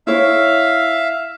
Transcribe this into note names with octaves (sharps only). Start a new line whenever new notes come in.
E4 C#5 E5 F5